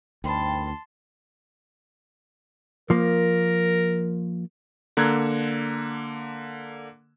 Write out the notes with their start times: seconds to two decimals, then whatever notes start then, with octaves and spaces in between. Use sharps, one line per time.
0.24 D2 G2 D#3 C4 G5 A5 B5 C6
2.90 F3 A#3 A#4
4.97 D3 A#3 A#5 E6 F#6 G#6